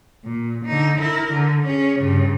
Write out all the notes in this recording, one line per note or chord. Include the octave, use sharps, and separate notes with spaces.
A#2
D3 D#4
E4 A#4
D3
C#4 G#4
G2 C#3